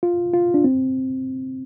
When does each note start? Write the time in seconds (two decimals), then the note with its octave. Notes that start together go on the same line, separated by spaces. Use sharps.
0.03 F4
0.33 F4
0.54 D4
0.64 C4